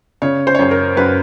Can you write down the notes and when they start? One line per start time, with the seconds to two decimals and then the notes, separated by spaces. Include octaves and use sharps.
0.22 C#3 C#5
0.47 C5
0.55 C#5
0.59 F#2 C5
0.71 A#4
0.97 F#2 B4